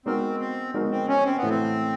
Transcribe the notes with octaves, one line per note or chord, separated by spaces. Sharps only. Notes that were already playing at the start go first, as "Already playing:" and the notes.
G#3 B3 C4 D#4 F#4 A#4
C4
G#3 B3 D#4 F#4 A#4
C4
C#4
C4
B3
A2 E3 A3
C4